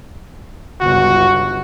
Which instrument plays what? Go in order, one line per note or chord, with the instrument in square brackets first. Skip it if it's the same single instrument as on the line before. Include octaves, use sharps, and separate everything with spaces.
[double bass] G1 C#2 [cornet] F#4